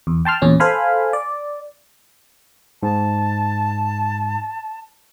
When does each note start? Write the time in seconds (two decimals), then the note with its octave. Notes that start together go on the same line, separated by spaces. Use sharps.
0.07 E2
0.25 G5 A5 C6 F6
0.42 E2 A#2 C#4
0.60 A4 C5 F5 G#5 B5
1.13 D5
2.83 G#2 A5